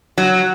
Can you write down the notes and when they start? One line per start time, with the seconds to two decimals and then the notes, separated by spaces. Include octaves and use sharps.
0.18 F#3